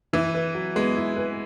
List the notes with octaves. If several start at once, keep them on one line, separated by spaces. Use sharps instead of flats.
E3 E4
B4
F#3
G#3 B3
E4
B4